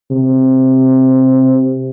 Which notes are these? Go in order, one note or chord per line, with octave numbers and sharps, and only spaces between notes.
C3